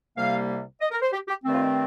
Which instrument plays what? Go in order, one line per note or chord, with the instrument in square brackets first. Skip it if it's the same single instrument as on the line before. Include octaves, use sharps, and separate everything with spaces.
[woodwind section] C2 C3 G3 A#3 F5
D#5
A#4
C5
G4
G4
G2 D#3 A3 C4
F4
D#4